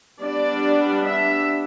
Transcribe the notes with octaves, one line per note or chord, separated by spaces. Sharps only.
G3 B3 D4 D5
E5